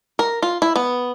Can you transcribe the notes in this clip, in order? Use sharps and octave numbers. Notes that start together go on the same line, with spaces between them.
A#4
F4
E4
B3